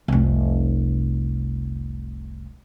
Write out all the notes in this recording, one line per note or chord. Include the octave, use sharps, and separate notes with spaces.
F1 C2